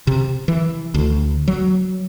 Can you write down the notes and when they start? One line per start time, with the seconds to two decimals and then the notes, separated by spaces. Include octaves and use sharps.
0.07 C3
0.48 E3
0.94 D2
1.48 F#3